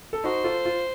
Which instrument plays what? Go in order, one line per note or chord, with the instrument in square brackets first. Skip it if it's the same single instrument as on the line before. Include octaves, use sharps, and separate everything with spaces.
[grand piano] A4
[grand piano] D#4 F#4 [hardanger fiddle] C5
[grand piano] F4 A4
F4